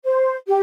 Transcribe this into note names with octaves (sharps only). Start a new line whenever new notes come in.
C5
G4